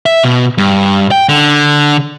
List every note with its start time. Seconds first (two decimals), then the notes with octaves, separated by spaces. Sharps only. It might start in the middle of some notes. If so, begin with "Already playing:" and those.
0.06 E5
0.23 B2
0.58 G2
1.11 G5
1.29 D3